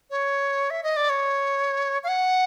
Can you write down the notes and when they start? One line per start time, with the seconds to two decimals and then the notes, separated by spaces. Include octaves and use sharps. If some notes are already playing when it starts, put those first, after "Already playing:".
0.10 C#5
0.70 E5
0.83 D#5
0.96 D5
1.09 C#5
2.03 F5
2.08 F#5